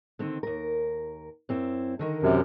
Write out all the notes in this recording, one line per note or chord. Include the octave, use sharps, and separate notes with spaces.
D3 D#3 C4
D#2 A#4
F#2 C4 E4
D3 D#3 A#4
F#2 C3